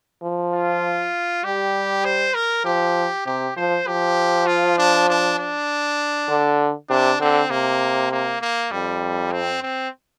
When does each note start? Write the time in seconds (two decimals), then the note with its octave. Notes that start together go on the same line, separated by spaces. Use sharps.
0.23 F3
0.54 F4
1.44 G3 G4
2.05 C5
2.34 A#4
2.65 F3 G4
3.26 C3 G4
3.57 F3 C5
3.87 F3 G4
4.47 F4
4.78 D4
5.09 D4
5.39 D4
6.29 D3
6.90 C3 D4
7.20 D3 C4
7.50 C3 A#3
8.11 A#3
8.41 A#3
8.72 F2 G3
9.32 C4
9.63 C4